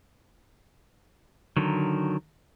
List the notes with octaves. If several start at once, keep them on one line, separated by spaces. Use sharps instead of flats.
D3 D#3 F#3